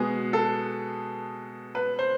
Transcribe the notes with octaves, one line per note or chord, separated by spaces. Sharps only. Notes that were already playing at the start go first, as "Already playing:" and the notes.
Already playing: B2 G#3 B3 G#4
A4
B4
C5